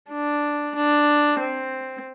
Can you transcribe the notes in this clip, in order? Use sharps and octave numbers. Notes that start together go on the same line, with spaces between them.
D4
D4
C4